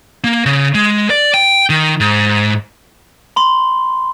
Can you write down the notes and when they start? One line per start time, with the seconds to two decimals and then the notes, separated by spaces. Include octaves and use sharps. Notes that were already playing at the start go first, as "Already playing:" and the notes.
0.24 A#3
0.46 C#3
0.75 G#3
1.10 D5
1.34 G5
1.70 D#3
2.00 G#2
3.36 B5 C6